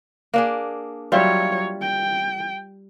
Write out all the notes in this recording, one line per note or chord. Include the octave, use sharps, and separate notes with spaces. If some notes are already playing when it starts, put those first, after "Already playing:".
A#3 D4 G#4
F#3 G3 F4 C#5 E5
G5